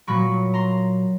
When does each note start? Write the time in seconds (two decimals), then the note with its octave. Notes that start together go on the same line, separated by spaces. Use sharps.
0.07 A#2 F#3 A#3 B5 C#6
0.54 A#5 C6